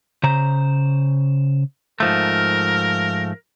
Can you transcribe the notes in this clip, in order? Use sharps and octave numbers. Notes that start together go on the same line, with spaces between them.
C#3 C5 A#5
G#2 F3 A3 A#4